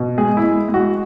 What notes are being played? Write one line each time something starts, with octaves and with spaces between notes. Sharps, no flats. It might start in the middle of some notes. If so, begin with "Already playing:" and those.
Already playing: B2
G#3 G#4
E4
G#3
G#3
F#4